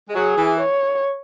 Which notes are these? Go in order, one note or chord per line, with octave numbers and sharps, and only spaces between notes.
G#3
F#3 G#4
E3
C#5